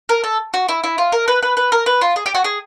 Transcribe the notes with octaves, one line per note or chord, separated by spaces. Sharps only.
A#4
A4
F#4
E4
E4
F4
A#4
B4
B4
B4
A#4
B4
F4
G#4
G4
F#4
G#4